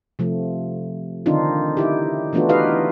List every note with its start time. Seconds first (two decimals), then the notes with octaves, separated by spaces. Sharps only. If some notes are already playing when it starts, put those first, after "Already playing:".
0.19 C3 F3 A3
1.26 D3 D#3 C4 D4 D#4 F4
1.77 D#4 E4 G4
2.33 E3 A3 B3 D4 F4 F#4
2.49 D#4 E4 G4 B4 D#5 F5